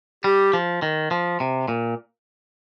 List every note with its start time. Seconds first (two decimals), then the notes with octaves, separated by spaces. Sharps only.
0.24 G3 G4
0.53 F3
0.82 D#3
1.11 F3
1.40 C3
1.68 A#2